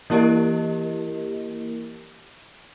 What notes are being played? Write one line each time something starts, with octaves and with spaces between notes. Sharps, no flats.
E3 A#3 E4 G4 A#4 D#5